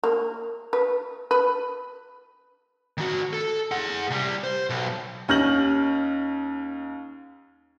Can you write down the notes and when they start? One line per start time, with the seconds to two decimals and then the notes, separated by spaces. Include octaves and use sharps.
0.04 A#3
0.73 B4
1.31 B4
2.98 D#3 F#4
3.33 A4
3.71 G#4 F#5
4.10 C3 G3
4.44 C5
4.70 B1
5.28 D#2 C#4 F6 G6 A#6 F#7